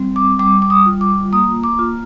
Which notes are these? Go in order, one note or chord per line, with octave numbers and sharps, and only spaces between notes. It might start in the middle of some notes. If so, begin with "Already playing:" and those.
Already playing: G3 C4
D6
G3 D6
D6
D#6
F4
D6
A#3 D#6
D6
F4